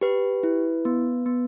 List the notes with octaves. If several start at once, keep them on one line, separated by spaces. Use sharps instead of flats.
G4 B4
E4
B3
B3